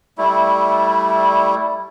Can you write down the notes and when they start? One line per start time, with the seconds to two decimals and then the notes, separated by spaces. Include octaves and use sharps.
0.18 G3 A3 E4